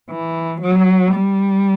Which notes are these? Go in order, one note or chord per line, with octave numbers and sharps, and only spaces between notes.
E3
F#3
G3